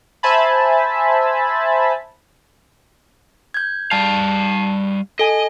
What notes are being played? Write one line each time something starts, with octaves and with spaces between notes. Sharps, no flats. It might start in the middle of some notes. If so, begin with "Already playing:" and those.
C5 E5 G#5 A5 B5
G6 G#6
G3 F5 A5
A4 D#5 G#5